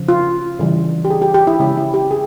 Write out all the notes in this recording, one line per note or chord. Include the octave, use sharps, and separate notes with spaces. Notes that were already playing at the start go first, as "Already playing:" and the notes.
Already playing: C#3 F3
F4
C#3 E3 G3
G4
G#4
G4
G4
E4
C#3 F3 G#3 C#4 E4
E4
G4
G#4